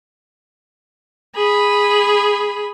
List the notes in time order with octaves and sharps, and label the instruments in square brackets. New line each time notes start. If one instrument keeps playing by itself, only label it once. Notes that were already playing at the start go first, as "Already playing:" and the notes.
[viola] G#4 B5